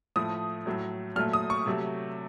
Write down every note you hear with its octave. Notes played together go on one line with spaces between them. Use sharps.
A2 F3 A3 D#6
A2 F#3 A3
A#2 F#3 A3 F6
D#6
C#6
C3 F#3 A3